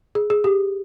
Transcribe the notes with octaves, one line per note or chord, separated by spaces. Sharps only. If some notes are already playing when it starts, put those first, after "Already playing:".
G#4
G#4
G4